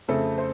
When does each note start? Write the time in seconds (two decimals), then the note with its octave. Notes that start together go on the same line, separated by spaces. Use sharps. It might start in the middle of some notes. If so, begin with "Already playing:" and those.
0.08 F2 C#3 A3 C4 A4
0.38 C5